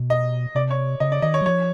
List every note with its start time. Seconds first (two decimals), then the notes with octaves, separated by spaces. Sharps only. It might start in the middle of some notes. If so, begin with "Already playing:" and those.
Already playing: B2
0.10 D#5
0.55 C3 D5
0.71 C#5
1.00 C#3 D#5
1.12 D5
1.22 D#3 D#5
1.34 C#5
1.41 F#3
1.46 F3 C#5